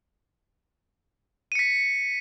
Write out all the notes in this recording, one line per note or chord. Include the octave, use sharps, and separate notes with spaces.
B6 C#7 D#7